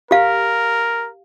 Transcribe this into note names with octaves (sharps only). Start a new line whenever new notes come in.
G4 A#4 F5